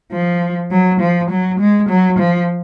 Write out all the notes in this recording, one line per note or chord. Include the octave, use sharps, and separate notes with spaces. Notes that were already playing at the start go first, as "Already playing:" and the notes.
F3
F#3
F3
F#3
G#3
F#3
F3